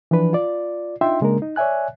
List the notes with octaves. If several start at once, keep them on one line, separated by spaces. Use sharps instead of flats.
E3 F3 D4 B4
F4 D5
D4 D#4 F4 E5 G5 C6
C#3 G#3 A#3 D4 A#4
D#4
C#5 D5 E5 G#5 F#6